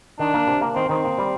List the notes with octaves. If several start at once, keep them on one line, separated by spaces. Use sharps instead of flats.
D#3 D4
A#3
C3
A#3
D#3 C4
D#3 C4
A#3
G3